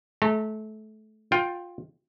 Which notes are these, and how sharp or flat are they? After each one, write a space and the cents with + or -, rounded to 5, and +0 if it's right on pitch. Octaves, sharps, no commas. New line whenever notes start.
A3 -25 A#5 -45
F4 +15 G5 +0